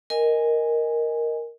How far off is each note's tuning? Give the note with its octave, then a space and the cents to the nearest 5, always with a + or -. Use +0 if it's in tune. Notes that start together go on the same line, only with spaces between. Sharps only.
A#4 +0 D#5 +0 G#5 -10